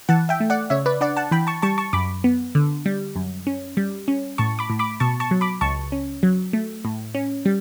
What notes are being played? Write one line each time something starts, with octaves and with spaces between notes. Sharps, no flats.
E3 F#5 A5
E5 G5
A3
D5 F#5
C#3 C#5 E5
B4 D5
D4 D5 F#5
F#5 A5
E3 G5 B5
A5 C#6
G3 A5 C#6
A5 C#6
F#2 B5 D6
B3
D3
G3
F#2
C#4
G3
C#4
A2 A5 C#6
B5 D6
A2
B5 D6
B2 A5 C#6
A5 C#6
F#3
B5 D6
C#2 A5 C#6
C#4
F#3
A3
A2
C#4
G3